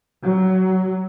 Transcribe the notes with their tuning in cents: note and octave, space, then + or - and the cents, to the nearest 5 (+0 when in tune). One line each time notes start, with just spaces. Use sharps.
F#3 +20